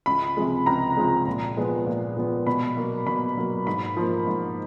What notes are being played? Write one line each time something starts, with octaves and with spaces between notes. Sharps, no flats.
C#2 B5
C3 F3 G#3
C#2 A#5
C3 F3 G#3
A#2
F3 G#3 B3
A#2
F3 G#3 B3
B2 B5
F#3 A#3
B2 B5
F#3 A#3
G#2 B5
F3 A#3
G#2